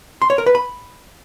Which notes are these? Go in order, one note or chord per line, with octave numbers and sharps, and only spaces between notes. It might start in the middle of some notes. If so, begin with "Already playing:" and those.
C6
C#5
A#4
B4
B5